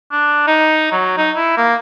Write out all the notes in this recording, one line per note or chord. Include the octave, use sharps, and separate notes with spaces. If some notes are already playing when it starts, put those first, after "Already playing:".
D4
D#4
F#3
D#4
E4
A#3